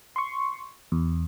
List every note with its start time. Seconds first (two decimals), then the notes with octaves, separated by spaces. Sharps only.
0.16 C6 C#6
0.92 E2